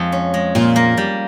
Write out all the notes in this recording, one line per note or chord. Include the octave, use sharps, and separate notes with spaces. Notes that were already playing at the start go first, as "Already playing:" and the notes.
Already playing: F2 G#3
C#4
G#3
A#2 F4
A#3
G3